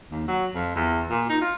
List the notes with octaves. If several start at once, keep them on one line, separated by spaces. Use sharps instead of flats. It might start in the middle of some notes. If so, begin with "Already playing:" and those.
D#2
F#3
F2
E2
A#2
D#4
F4